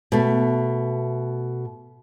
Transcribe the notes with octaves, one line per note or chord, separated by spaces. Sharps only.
B2 A3